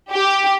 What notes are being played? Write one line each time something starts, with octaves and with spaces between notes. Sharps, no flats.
G4